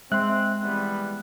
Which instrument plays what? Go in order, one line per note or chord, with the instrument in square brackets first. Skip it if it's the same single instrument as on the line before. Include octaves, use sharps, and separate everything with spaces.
[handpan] G#3 [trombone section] C4 [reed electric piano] E5 C6 [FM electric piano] F#6
[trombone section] E3 G3 B3